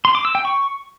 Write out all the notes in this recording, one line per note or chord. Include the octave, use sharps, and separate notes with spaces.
C6
D6
E6
G5
C#6